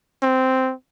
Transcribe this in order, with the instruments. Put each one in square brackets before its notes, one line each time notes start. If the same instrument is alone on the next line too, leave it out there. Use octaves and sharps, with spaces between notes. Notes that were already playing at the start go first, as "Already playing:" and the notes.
[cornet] C4